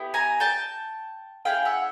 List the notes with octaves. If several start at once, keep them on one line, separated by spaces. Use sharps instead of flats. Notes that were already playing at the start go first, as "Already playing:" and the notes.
Already playing: B3 E4 G4
G#5 A#5
G5 A5
C#4 E4 G#4 F5 G5
E5 F#5